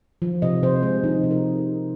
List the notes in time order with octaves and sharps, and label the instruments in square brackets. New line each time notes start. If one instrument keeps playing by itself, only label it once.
[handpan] F3
C3 D#5
C3 C5
G#3 G#4
F3 D#4
C3
A#4